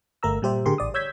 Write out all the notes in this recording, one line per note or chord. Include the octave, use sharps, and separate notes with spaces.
G1 A3 A#4 A#5 E6
A#2 G3 G4 C5 E5
A2 D3 G4 G#4 A#4 C6
A1 D5 D#6
C#5 E6 G6 G#6 B6